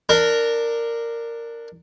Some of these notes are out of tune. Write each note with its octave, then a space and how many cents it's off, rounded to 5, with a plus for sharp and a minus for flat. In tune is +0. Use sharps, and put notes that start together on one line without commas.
D4 +10 A#4 -10